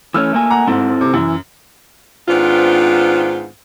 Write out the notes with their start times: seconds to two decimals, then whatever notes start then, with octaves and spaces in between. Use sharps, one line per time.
0.14 E3 A3 C#4 E6 F6
0.33 A3 A#3 G#5
0.50 F#5 A#5
0.67 G#2 C4 E4 A4
1.01 C3
1.14 F#2 E3 E4
2.29 G#2 D#3 B3 C4 D4 F4